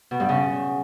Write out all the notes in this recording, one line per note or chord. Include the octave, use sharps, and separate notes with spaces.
B2
G2
C#3